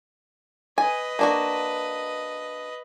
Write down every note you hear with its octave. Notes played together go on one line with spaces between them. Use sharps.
B4 D#5 G#5
A#3 D4 F#4